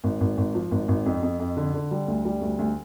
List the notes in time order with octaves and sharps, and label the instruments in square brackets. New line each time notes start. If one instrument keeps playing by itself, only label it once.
[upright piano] G#1
G#1
G#1
F3
G#1
G#1
F2
F2
F2
D3
D3
G3
D2
G3
D2
D2